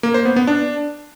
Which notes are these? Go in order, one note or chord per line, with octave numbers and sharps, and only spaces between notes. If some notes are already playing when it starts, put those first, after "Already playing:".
A#3
C5
B3
B3
D4